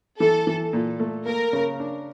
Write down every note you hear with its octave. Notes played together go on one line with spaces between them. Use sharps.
E3 A4
E3
A#2
A3
A#3 A#4
C#3
D4